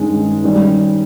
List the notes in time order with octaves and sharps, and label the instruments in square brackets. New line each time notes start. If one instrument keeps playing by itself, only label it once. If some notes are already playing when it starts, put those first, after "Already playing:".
Already playing: [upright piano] G2 D#3 G#3 C#4
D#3 G3 C#4 G4